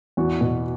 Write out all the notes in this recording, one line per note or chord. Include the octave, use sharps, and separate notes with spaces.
E2 F#4
B2